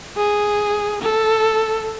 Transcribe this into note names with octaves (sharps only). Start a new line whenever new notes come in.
G#4
A4